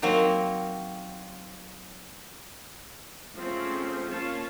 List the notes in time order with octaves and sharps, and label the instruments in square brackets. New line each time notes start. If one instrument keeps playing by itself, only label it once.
[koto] D#3 F#3 A#3 C4 A#4
[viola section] F3 G#3 A3 C4 C#4
A#3 C#4 F4 C#5 F5 A5